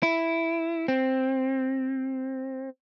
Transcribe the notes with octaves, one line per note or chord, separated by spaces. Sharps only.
E4
C4